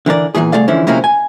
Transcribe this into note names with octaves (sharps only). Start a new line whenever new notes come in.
D3 E3 A#4 D5
E2 G2 A#2 E3 G#4
C2 A3 G#4 D5 F5
D3 E3 F3 G#3 C#4 E4
C3 F3 G#3 A#3 C#4 E4
G#5